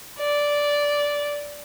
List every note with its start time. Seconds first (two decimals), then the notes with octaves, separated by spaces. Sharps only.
0.19 D5